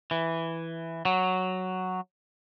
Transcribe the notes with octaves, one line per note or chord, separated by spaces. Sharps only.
E3
F#3